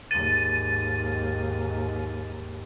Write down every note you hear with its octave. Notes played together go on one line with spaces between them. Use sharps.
D#2 G#2 A6 D#7